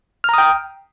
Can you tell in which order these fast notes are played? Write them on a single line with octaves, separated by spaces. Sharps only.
F6 A#5 D#6 G5